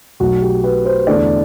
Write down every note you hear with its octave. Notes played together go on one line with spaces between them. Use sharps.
B1 B2 F#3 A3 F#4
G4
B4
C5
E2 D3 A3 D5